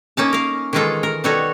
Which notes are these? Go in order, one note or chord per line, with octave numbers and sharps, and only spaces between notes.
A#3 C#4 D#4 A5
A#4 F5
D#3 E3 G#3 D#4 F4 A4
A#4
B2 G3 D#4 F#4 A4 C#5